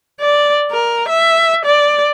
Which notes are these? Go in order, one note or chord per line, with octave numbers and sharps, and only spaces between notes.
D5
A#4
E5
D5